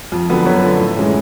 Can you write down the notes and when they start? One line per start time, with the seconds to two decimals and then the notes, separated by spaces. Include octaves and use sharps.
0.12 F2
0.29 D3 F#3 B3
0.45 F#2 B4 C#5
0.62 D3 F3 A3
0.80 A2
0.97 E3 G#3 C#4